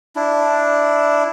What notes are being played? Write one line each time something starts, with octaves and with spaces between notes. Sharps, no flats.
D4 E4